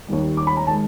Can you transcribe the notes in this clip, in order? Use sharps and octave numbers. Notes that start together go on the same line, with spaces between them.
D#2 D#3 G3
D6
B5
A#5
D#3 G#3 A5